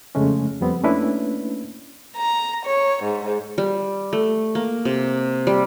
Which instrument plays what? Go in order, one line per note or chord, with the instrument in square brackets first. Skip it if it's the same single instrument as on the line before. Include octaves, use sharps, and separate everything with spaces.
[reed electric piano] F2 C#3 G#3 A3 C#4
F2 G3 B3 C4
A3 A#3 C#4 D4 E4 B4
[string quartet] A#5
C#5
G#2
[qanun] G3
A3
A#3
C3
G3